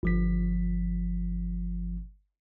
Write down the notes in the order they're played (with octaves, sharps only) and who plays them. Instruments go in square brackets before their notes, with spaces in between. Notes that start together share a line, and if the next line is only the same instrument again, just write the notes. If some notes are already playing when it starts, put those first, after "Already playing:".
[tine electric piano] G1 F3 B6